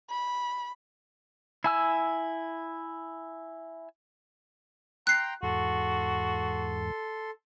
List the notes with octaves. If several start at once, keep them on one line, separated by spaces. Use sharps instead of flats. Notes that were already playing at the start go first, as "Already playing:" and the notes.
B5
E4 G#5 E6
G5 A#5 C6 F#6 C7
E2 G#2 F#4 A4 C6